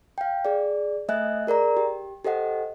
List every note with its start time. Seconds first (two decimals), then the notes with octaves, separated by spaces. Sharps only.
0.18 F5 G5
0.45 G#4 D5
1.09 A3 D#5 E5 G#5 F#6
1.47 G#4 A#4 D5 A#5
1.77 G4
2.24 G4 A4 C5 D#5 F#5